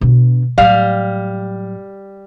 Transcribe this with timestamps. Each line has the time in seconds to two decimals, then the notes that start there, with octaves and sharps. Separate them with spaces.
0.01 B2 D3
0.58 A2 F#3 G3 F5